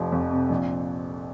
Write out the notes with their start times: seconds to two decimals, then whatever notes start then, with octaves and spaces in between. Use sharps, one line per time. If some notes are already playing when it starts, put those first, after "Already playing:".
Already playing: F1 F3
0.12 F2
0.31 C3
0.50 A#1